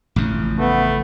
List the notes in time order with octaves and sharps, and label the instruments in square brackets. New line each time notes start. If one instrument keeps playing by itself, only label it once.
[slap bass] A1 F2 C#3
[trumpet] A3 [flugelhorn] B3